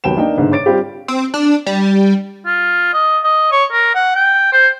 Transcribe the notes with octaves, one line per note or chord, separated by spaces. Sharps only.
D#2 F#3 B3 G5 E7
A#3 D4 D#4 G5
G1 G#2 D3
C#5 D6 A6 D7
G3 C4 F4 G4
C4
D4
G3
F4
D#5
D#5
C#5
A#4
F#5
G5
C5